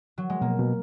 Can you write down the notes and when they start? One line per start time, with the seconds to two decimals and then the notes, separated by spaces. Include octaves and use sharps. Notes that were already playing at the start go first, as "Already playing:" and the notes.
0.18 F#3
0.30 G#3
0.41 B2 A#3
0.59 B2